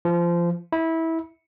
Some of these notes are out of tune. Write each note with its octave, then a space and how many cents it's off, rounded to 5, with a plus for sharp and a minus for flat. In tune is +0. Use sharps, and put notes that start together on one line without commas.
F3 -20
E4 -20